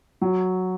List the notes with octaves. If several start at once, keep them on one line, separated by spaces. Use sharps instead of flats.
F#3